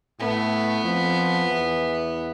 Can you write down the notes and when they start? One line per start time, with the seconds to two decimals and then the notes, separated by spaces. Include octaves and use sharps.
0.19 A2 A3 B3
0.84 F2 F3
1.48 E2 E3